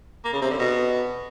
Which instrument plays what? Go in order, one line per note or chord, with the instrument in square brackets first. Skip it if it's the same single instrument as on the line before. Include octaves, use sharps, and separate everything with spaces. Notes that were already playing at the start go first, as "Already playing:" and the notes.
[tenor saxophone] A#3
C#3
C3
D3
B2